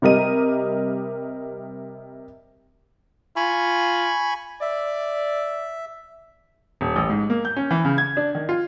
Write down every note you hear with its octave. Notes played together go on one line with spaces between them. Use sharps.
C3 G3 A#4 D#5 D#7
F4 G#5 B5 C#6
D5 E5
D#1
A1
G#2
A#3
G6
C#4
E3
C#3
G#6
D4
D#3
F4